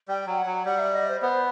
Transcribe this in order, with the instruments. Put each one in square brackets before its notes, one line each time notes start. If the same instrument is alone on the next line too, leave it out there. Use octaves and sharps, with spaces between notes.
[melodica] G3 [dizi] G5
[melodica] F#3
[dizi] F#5
[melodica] F#3
[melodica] G3 [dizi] F#5
[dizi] E5
D#5
C5
[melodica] B3 [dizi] C5